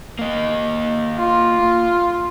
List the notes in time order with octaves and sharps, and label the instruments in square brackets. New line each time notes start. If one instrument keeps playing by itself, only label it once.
[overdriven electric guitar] A#3 D#5
[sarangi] F4